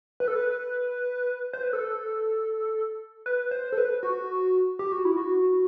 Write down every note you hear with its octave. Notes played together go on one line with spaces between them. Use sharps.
B4
A4
B4
C5
B4
A4
B4
C5
A4
B4
F#4
G4
F#4
E4
F#4